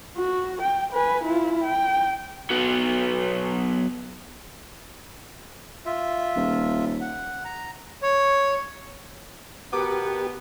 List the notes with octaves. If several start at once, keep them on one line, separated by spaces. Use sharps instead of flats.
F#4
G5
B4 G#5
E4 F4
G5
F#3 B3
F4 E5
D#1
F#5
A#5
C#5
B2 B3 G4 A#4 D6